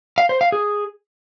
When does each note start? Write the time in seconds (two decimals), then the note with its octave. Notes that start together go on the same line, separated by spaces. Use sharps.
0.18 F5
0.29 C5
0.41 F5
0.52 G#4